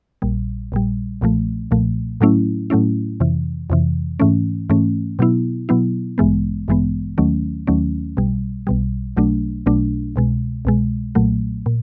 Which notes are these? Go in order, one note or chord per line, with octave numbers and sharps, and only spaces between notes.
A#1 A#2 G3
A#1 A#2 G3
B1 A#2 F3 A3
B1 A#2 F3 A3
A2 F#3 A3 C#4 E4
A2 F#3 A3 C#4 E4
F2 C3 E3
F2 C3 E3
G#2 E3 A3 C#4
G#2 E3 A3 C#4
B2 F#3 B3 E4
B2 F#3 B3 E4
A1 G2 E3 G#3 B3
A1 G2 E3 G#3 B3
D#2 D#3 F#3 A3 C#4
D#2 D#3 F#3 A3 C#4
B1 B2 G3
B1 B2 G3
B1 B2 F#3 A3 D4
B1 B2 F#3 A3 D4
C2 B2 G#3
C2 B2 G#3
B1 A#2 F#3 A3
A#2